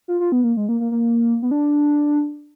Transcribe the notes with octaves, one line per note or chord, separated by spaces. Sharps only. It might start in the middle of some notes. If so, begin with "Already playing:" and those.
F4
F4
B3
A#3
G#3
A#3
A#3
A#3
B3
D4